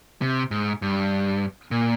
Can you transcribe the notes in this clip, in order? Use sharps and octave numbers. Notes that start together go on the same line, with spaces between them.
C3
G#2
G2
A#2